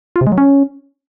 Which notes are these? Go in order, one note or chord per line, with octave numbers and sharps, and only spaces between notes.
F4
C3
G#3
F#3
C#4